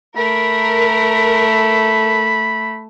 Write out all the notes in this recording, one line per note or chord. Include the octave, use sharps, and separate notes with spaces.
A3 A#4 B5